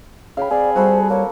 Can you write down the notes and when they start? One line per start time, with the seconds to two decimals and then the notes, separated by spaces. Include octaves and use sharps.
0.37 C#3 F5 G5 B5
0.50 C4 G#4 D5
0.76 G3 F#4 A4 C5 B5
1.10 A#3 C#5